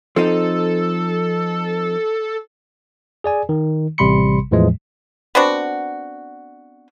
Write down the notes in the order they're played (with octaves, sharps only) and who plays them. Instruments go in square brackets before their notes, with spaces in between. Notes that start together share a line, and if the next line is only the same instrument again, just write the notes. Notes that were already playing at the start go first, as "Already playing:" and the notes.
[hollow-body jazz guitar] F3 C4 D#4 [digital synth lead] A4
[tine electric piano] G#4 D5 G#5
D#3
A1 C3 G3 B5 C6 C#7
E2 A2 E3 F3 G#3
[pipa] B3 C4 D4 F#4